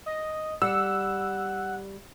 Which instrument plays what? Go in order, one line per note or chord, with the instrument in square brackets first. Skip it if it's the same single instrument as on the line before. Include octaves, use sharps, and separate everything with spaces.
[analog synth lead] D#5
[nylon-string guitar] G3 [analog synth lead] F#5 [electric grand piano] E6